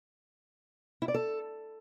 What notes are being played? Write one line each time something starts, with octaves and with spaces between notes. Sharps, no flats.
E4
D5
A4